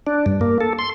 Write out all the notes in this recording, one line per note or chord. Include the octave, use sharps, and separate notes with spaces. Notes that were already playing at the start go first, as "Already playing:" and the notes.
D4
G2
A#3
A4
C6